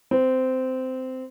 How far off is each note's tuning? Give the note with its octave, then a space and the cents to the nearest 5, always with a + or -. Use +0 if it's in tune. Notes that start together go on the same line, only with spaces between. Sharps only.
C4 -15